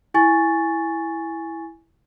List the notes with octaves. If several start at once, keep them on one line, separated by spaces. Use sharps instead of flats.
E4 G#5 C#6 A6